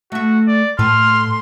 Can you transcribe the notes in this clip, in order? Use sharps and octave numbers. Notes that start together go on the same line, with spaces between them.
A3 F#4 E5
D5
A2 A3 A4 B4 C6 F6